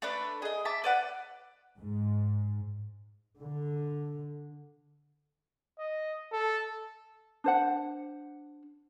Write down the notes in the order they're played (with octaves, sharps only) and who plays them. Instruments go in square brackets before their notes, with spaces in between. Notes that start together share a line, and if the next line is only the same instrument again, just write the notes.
[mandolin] A3 D4 B4
G#4 D#5
E5 A5 D6
B4 D5 F#5
[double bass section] G#2
D3
[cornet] D#5
A4
[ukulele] D4 C5 F#5